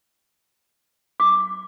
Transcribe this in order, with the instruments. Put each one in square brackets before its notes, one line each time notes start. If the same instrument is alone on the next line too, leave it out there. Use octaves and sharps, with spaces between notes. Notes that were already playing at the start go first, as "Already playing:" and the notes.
[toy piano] D6